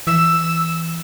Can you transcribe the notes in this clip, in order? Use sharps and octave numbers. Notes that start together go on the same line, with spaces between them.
E3 E6